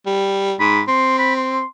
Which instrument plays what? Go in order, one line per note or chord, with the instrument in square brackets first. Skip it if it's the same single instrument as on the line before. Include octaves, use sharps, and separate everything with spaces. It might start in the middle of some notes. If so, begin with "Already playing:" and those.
[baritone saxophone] G3
[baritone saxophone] G#2 [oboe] B5
[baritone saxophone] C4 [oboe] C6
[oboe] B5
C6